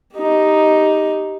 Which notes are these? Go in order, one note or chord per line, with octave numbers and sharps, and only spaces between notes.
D#4 G4